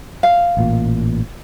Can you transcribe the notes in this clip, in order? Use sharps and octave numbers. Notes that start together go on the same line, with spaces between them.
F5
A1 A#2